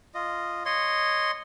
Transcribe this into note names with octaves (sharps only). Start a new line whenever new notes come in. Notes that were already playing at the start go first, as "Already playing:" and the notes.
F4 D#5
C#5 D#5 C6